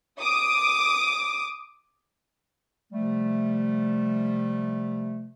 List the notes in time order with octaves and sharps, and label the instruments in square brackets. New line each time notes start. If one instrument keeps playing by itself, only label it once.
[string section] D6 D#6
[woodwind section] C3 F3 G3 A3